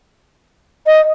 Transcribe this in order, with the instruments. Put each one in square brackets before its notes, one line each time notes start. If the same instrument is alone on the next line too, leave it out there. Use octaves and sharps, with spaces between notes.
[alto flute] D#5